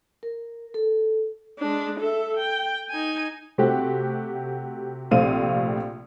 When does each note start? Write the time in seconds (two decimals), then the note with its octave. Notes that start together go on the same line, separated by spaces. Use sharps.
0.23 A#4
0.74 A4
1.59 G#3 D4
2.00 A4 E5
2.37 G5
2.90 D#4 G#5
3.58 C3 A3 C4 F#4 G4
5.11 A#1 C3 A3 C4 F5 D#7